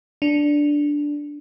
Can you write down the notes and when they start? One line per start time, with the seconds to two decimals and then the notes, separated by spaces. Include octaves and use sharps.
0.22 D4